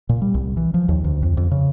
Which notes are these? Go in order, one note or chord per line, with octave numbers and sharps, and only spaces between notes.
A#2
G3
C2
E3
F3
D#2
D2
F2
F2
C#3